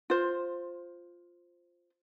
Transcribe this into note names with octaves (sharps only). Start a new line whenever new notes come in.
F4 C5